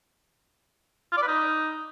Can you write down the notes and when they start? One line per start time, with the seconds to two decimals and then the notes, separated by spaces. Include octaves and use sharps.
1.12 F4
1.17 D5
1.22 B4
1.27 D#4